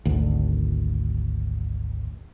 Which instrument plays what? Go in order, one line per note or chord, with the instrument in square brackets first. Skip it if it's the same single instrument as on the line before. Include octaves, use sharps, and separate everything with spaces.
[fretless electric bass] G#1 D2